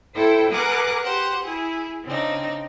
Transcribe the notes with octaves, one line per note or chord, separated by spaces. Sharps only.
E4 A4 C5 G5
G#4 A#4 B4 F#5 D6 F#6
G4 C5 F#5
E4 G#4
C#3 C4 D4 D#4